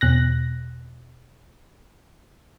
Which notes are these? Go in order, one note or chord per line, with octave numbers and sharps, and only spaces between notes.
E2 B2 F#6 A#6